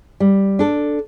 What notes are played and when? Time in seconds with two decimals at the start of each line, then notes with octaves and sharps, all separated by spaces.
0.20 G3
0.59 D4 A4